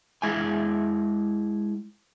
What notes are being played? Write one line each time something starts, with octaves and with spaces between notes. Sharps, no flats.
G#3 E4 F5 G5 G#5